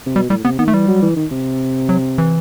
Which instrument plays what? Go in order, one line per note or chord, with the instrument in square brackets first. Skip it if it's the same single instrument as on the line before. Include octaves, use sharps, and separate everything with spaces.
[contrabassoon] C3
[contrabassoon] B2 [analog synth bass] G3
[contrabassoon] A2 [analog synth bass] G3
[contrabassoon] C3 [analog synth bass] B3
[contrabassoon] D#3 [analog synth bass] B3
[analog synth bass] A3
[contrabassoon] E3 [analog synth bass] G3
[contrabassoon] F#3
E3
D#3
C3
[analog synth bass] F#3
E3